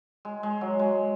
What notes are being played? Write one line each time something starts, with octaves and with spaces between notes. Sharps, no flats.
G#3
G#3
F#3
G#3